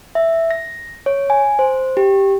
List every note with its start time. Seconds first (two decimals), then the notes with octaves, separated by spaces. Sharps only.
0.15 E5
0.51 A#6
1.06 C#5
1.30 G#5
1.59 C5
1.97 G4